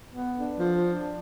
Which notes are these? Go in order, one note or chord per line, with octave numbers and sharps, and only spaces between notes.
B3
D4
F3
D4